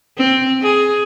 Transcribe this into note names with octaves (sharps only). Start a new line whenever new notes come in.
C4
G#4